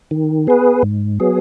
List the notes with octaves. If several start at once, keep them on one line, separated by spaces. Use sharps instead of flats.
D#3
B3 G#4 B4
G#2
F#3 B3 G#4